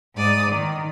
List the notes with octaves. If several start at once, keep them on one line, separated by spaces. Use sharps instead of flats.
G#2 D5 D#6
D#3